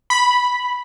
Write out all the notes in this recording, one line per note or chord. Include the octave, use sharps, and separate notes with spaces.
B5